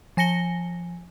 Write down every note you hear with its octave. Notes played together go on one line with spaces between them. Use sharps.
F3 G#5 A#6 C#7 G7